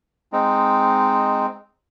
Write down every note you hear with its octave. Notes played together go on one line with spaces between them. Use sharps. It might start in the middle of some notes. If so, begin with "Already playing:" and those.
G#3 C4 D#4